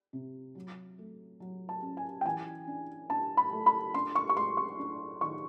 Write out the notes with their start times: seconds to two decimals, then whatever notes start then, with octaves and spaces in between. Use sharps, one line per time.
0.13 C3
0.55 F#3
0.99 A3
1.40 F#3
1.69 A5
1.83 C#4
1.97 G#5
2.21 G5
2.24 E3 G#5
2.67 D4
3.10 D4 A5
3.37 B5
3.52 A3
3.66 B5
3.94 D4 C6
4.15 C#6
4.29 C#6
4.37 G#3 C6
4.57 C#6
4.79 D4
5.21 D#3 C#6